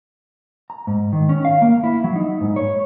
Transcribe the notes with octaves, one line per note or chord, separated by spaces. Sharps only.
A#5
G#2
D#3
C#4
F5
A#3
E4
F#3
D#4
G#2
C#5